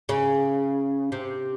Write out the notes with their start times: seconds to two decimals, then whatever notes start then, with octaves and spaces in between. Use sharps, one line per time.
0.09 C#3
1.12 C3